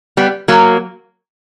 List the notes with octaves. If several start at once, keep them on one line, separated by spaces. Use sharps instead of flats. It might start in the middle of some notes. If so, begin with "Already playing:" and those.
G3 B3
F#3 A#3